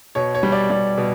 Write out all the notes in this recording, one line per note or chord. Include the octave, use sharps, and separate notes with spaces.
B2 C#5
C#5
G3
D5
G3 D5
B2